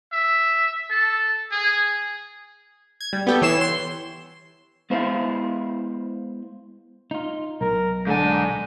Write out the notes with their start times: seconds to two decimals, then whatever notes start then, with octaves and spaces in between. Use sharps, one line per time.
0.13 E5
0.90 A4
1.52 G#4
3.01 G#6
3.13 G3
3.27 B3 G4 A4
3.42 E3 C#5 C7 E7
3.61 C6
4.90 G#3 B3 E4 C5 E5 F5
7.11 D#4 F4
7.61 B1 A#4
8.07 G#2 D3 D4 G#5